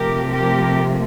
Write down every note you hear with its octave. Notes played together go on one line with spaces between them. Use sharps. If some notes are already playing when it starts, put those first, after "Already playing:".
Already playing: C3 F3 A3 G4 A#4
G4 A#4